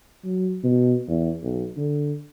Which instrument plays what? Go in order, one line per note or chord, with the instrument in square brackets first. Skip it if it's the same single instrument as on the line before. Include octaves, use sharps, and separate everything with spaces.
[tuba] F#3
B2
E2
B1
D3